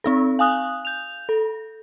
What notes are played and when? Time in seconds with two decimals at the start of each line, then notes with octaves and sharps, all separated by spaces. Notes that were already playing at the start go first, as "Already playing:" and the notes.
0.04 C4 D#4 A4
0.39 F5 G#5 D#6 F#6
0.85 G6 F7
1.29 A4